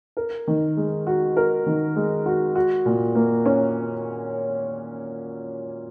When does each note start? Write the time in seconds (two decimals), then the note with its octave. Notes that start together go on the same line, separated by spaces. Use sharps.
0.17 A#4
0.48 D#3
0.77 G#3
1.07 F#4
1.37 A#4
1.66 D#3
1.96 G#3
2.26 F#4
2.55 F#4
2.86 A#2
3.15 A#3
3.46 C#4